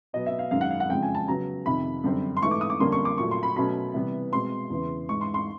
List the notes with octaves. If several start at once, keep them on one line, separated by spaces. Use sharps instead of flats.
B2 F#3 B3 D#5
E5
F5
F#2 D#3 G#3 F5
F#5
F5
F#5
F2 C#3 F3 G#3 G5
G#5
A5
C#3 F#3 B3 A#5
F2 C3 D#3 B5
F#2 D3 G3 C4
C6
G#2 E3 A3 C#6
D6
D#6
D6
F2 D3 G3 A#3 C#4 C6
C#6
D6
A#2 F#3 A3 C#6
C6
B5
B2 F#3 A3 C#4 B5
C3 E3 G3 B3
B2 G#3 C4 C6
E2 C#3 E3
G#2 E3 G#3 C#6
C6
C6